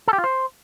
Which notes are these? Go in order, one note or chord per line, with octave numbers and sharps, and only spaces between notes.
A4
G4
F4
C5